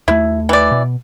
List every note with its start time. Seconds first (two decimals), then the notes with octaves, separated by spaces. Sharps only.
0.08 D#2 A3 E4
0.49 E3 D5
0.71 B2